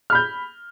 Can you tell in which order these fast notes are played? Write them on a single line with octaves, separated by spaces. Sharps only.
F6 B5 G6